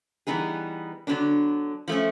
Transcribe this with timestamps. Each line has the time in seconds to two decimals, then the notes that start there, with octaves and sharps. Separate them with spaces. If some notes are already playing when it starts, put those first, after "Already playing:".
0.27 E3 G3 B3 D#4 G#4
1.07 D3 F#3 B3 D4
1.88 F3 A3 C#4